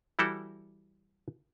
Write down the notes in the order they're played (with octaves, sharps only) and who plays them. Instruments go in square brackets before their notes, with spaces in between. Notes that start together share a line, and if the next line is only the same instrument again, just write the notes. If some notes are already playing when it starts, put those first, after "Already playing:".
[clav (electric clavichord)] E3 G3 E4 F#4 A4